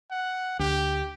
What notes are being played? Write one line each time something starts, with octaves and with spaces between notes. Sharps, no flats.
F#5
D2 G4